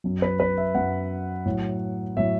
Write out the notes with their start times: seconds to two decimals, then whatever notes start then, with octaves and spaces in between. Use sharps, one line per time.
0.04 F#2 F#3
0.22 B4
0.40 B4
0.58 E5
0.75 F#2 F#3 F#5
1.45 A2 F#3
2.17 A2 F#3 E5